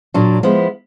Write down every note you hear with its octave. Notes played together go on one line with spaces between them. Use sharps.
A#2 F#3 A#3 D4
F3 G#3 B3 E4